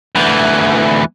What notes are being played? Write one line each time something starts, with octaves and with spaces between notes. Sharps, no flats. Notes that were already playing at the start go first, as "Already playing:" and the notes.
D2 E3